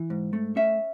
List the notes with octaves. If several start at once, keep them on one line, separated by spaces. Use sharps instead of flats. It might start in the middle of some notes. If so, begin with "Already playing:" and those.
Already playing: E3
G#2
A3
C#4 E5